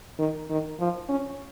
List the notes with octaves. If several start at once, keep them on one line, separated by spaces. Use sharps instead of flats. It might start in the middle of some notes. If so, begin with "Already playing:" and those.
D#3
D#3
F3
C#4